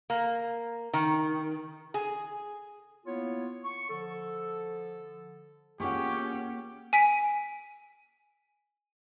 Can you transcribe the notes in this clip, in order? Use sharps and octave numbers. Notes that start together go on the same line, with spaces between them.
A#3
D#3
G#4
A#3 B3 E4 F4 C#5
C#6
D3 F3 A4
A#3 C#4 F4 G4 G#4 F#5 C#6
G#5 B6 D7